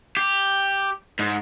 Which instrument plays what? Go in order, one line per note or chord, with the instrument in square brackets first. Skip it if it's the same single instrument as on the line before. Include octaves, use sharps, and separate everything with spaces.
[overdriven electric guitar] G4
G#2